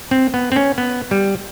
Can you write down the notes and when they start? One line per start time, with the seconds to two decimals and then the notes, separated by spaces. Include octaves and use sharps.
0.11 C4
0.34 B3
0.52 C4
0.56 C#4
0.78 B3
1.11 G3